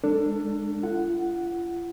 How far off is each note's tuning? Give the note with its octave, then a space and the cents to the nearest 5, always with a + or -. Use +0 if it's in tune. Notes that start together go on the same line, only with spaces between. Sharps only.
G#3 +0 D4 +0 A4 +25
F4 -40 F#5 +0